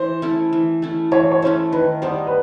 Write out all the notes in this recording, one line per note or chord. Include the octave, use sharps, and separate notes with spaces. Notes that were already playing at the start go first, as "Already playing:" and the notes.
Already playing: E3 C5
A3 C#4 E4
E3
A3 C#4 E4
E3 C#5
C#5
A3 C#4 E4 C5
D#3 B4
G3 B3 D#4 C5
B4